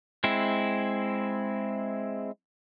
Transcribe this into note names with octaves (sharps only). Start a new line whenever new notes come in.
G#3 C4 E4